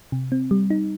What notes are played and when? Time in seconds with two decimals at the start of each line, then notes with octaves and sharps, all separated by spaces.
0.12 C3
0.32 C4
0.51 G3
0.70 D#4